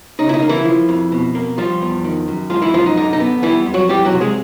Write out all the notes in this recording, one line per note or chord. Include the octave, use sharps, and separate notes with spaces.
C#3 D#4
E4
D#4
A#3
E3 E4
F3
F2
B2
A#3
F3 G3 F4
E2
D#3
F#2
F3 G#3 F4
E3 E4
F#2 F3 F4
D#4
D3 D#4
D#4
B3
E3 G3 E4
F2
F#3 F#4
E3 G3 G4
F#3 F#4
C3
G#3 G#4